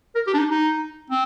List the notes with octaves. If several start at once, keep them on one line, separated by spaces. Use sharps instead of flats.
A#4
G4
D4
D#4
D#4
C4